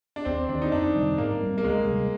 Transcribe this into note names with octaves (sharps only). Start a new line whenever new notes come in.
D4
D#2 C4
D#3 A#3 D4
D#4
F2 D4
C3 D#3 G3
G#2 A#3
G3 C4
A#3
D2 G#3
C3 G3